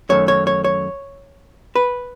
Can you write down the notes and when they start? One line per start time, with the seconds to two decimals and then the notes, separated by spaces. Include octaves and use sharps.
0.09 F#2 D#3 A3 C#5
0.28 C#5
0.47 C#5
0.64 C#5
1.75 B4